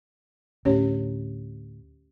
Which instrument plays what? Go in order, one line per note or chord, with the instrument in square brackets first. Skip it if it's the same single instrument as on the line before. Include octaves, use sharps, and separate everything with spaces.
[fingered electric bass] D2 A2 [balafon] C#4 G4 C#5